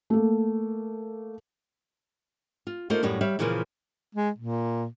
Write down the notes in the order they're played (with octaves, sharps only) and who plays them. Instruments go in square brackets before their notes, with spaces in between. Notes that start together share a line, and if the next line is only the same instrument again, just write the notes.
[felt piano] A3 A#3
[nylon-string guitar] F4
A3 A#3 D#4 F4 C5
F#2 A2 G3 B3 C#5
G3 C#5 E5 F5
A#2 C#3 E3 F3 G3 A#3
[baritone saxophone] G#3
A#2